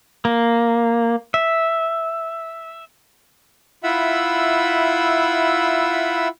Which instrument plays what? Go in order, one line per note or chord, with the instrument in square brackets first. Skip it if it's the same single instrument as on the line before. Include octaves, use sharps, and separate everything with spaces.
[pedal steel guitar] A#3
E5
[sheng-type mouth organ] E4 F4 E5 F#5 B5 E6